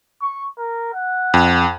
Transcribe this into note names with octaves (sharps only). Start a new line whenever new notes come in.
C#6
A#4
F#5
F2